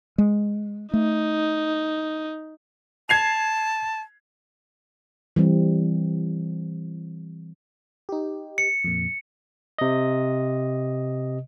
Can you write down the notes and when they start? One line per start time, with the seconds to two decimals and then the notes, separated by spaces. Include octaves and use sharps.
0.18 G#3
0.93 A3 D#4
3.09 A5 G#6 C7 F7
5.36 E3 G3 C4
8.09 D#4 G4
8.58 C#7
8.84 F2 A#2
9.78 C3 D#5